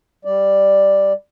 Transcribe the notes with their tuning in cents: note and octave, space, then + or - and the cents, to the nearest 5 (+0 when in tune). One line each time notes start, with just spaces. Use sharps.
G3 +0 D5 +0